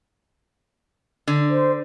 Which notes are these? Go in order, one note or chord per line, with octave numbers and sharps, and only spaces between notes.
D3
C5